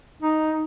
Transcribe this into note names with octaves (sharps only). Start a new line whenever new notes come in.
D#4